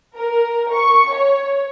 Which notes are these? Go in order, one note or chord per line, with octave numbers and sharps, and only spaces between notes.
A#4
C#6
C#5